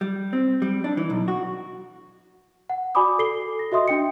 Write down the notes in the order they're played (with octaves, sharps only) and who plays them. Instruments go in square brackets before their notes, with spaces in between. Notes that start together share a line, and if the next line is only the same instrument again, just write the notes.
[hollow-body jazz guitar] G3
C4
G3
D4
E3
B1
F#4
[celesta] F#5
F#4 D5 G#5 B5 D6 D#6
A4 C7 G7
A#6
F#4 D#5 E5 C6 D#6
D4 G5 C#7